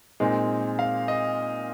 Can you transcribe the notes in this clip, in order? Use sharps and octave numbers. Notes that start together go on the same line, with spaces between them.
A#2 G#3 C4 D#4
F5
D#5